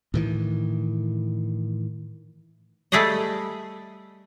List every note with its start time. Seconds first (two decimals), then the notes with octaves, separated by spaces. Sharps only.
0.14 A2 D#3 E3
2.92 G3 A3 G4 G#4 D5 D#5